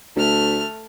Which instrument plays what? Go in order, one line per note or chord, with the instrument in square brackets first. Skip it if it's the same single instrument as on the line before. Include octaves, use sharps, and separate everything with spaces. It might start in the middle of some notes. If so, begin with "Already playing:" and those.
[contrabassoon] D2 [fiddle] A3 F6